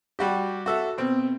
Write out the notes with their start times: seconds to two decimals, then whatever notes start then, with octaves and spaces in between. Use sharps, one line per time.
0.19 G3 F#4 G4
0.66 F#4 A4 E5
0.98 B2 C4